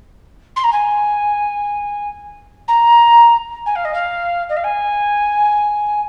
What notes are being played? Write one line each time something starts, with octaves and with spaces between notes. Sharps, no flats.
C6
A#5
G#5
A#5
G#5
F5
D#5
F5
D#5
F5
G#5